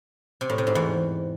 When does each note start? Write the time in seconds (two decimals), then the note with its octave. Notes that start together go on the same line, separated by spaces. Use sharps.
0.41 C3
0.50 A2
0.58 C3
0.67 G#2
0.75 E2